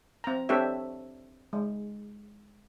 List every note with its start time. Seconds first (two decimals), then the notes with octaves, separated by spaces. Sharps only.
0.24 C4 A#5
0.49 C4 D4 G4 A4 C#5 E5
1.53 G#3